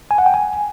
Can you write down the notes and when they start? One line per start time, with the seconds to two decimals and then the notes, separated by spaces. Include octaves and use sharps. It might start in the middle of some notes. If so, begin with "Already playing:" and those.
0.11 G#5
0.18 F#5
0.26 G5
0.34 G#5